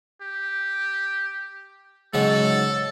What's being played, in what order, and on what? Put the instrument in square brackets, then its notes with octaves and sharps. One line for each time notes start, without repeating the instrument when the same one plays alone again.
[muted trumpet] G4
[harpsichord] G#2 C#3 F#3 [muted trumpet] A4